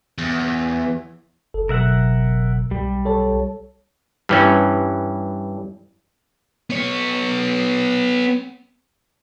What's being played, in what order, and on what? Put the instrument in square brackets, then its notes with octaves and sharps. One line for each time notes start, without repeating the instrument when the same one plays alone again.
[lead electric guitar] E2
[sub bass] F#1 [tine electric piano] A4
[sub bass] F#1 [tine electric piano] B2 F#3 [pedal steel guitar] A#4 E5 F#5
[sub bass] B1 [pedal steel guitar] G3 [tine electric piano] G4
[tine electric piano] A4 C#5 A5
[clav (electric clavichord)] G2 E3 C#4
[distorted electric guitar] B3 C#5